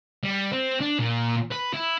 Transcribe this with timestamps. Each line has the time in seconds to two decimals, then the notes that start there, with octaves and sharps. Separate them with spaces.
0.24 G3
0.52 C4
0.81 D4
0.99 A#2
1.52 B4
1.74 E4